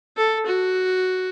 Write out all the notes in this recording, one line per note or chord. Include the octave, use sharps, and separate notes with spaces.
A4
F#4